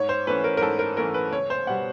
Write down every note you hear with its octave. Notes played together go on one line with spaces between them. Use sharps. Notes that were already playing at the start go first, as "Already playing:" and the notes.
Already playing: G#2 C#5
C5
E3 A3 C#4 B4
A#4
A#4
G#2 A4
A#4
E3 A3 C#4 A#4
B4
C#2 C#5
C5
B2 G3 B3 F#5